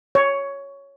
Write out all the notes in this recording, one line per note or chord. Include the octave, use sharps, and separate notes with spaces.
C#5